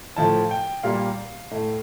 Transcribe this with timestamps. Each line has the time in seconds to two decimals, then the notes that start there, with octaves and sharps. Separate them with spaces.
0.17 A2 F3 A3 A5
0.51 G5
0.83 A#2 G3 A#3 F5
1.51 A2 A3